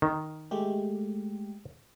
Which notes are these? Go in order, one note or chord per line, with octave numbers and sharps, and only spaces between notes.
D#3
G#3 A3 G4